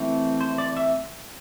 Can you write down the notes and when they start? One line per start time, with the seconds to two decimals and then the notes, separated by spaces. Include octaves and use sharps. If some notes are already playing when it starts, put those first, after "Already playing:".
Already playing: E3 A3 C4
0.41 C5
0.58 D5
0.77 E5